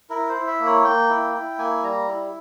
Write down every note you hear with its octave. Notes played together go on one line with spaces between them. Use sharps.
E4 A#4
C5
E4
E5
A#3
C#5
A#3 G5
E4
E4
A#3 G#5
G3 A#5
E4